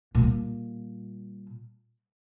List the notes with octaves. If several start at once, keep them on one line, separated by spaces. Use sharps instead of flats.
A#2 G3